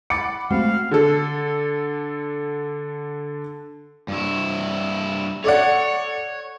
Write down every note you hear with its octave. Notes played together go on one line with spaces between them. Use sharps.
F#5 B5 D6 A6 C#7
G#3 A3 C4 F#4 F5
D3 A4
G2 E4
A4 C#5 D5 F#5